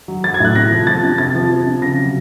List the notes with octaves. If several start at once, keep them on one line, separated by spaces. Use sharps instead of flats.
F#3
F#3 A6
G#6
A2 F#6
C3 A#6
F3
F3 A6
C3
C3 A6
F3
F3
C3
C#3 A#6
F#3